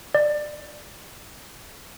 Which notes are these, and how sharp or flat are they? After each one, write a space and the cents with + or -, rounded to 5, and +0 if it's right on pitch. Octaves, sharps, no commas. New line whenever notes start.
D5 +20